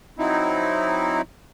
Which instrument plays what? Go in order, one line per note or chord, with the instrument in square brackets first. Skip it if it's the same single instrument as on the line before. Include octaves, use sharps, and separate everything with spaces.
[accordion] F#3 C4 D#4 E4